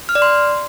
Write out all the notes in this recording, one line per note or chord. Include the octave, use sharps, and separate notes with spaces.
F6
D5
C6